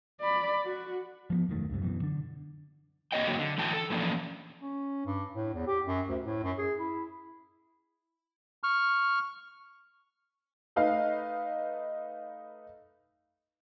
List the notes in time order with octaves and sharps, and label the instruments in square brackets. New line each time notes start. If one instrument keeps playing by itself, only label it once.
[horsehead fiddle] D5 B5
F#4
[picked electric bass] F3 A#3 B3
E1 F#2 D#3 A3
D1 C#2 G2 C3
F#2 B2 E3
D3 D4
[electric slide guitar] A#3 C4 C#5 D#5 G5
D3 F#3 A#3
D3
A2 E3 F#3 G5 A5
A4
E3 F3 A#3 C#4 D4
[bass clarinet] C#4
G2
A2
E2
G4
F#2
D2
A2
F#2
G#4
E4
[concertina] C#6 F6
[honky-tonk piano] A3 D#4 B4 F5